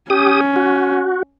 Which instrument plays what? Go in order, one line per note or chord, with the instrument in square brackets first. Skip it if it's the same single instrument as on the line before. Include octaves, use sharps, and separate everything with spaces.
[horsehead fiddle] C#4 [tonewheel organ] G4 D#6
[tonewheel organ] F#4